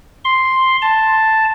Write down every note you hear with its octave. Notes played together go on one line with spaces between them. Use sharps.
C6
A5